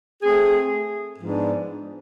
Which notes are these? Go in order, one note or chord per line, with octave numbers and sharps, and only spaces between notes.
A3 C4 G#4
G#2 F3 B3 D4